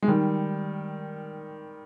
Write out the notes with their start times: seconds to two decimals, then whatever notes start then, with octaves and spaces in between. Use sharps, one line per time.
0.02 G#3
0.08 D#3 G3